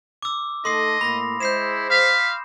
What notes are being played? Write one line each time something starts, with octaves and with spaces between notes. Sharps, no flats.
D6 E6
A3 D#4 A4 D#5 C6 D#6 C7
A2 A#3 B5 A#6
G#3 E4 C5 G6 C7 E7
F5 B6